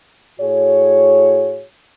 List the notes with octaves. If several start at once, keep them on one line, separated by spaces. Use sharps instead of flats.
A2 F#4 G#4 C#5